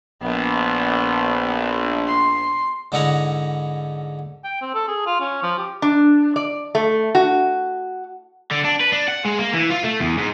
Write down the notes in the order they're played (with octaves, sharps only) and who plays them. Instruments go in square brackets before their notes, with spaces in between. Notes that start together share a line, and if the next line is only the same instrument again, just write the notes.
[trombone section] A#1 [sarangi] B3
[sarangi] C6
[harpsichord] G#2 D3 D#4 E4 F#5 A#5
[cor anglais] G5
C4
A4
G#4
F4
C#4
F3
G4
[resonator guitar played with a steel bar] D4
D5
A3
F#4
[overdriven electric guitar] D3
D4
B4
D4
F#5
G#3
A#3
E3
F4
A3
E2
G#2